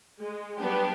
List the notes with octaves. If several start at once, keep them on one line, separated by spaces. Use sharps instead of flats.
G#3
F#3 G3 B3 D4 G4